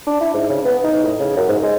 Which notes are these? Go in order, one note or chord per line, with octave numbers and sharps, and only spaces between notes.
D4
E4
G#2
C#3
B3
D#4
A2
C#3
F#2
G#2
G#3